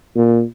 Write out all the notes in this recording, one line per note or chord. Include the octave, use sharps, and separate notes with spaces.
A#2